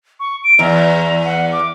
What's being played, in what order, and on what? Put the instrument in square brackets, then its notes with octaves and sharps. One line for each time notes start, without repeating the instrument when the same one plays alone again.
[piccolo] C#6
D7
[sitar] E2 [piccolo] A#5
[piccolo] F#5
D6